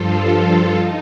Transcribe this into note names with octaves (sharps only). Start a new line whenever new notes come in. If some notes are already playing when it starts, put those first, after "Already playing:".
Already playing: G2 F3 F4 A4
D#4